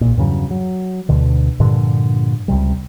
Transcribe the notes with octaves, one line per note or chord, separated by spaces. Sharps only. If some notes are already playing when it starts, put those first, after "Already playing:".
A#1 A#2
E2 G2 C#3 F#3
F#3
D2 B2 D3
G2 A#2 D3 F3
C#2 C3 G3